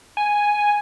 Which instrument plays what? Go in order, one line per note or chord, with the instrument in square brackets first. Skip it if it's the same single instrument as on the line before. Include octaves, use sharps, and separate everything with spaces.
[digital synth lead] G#5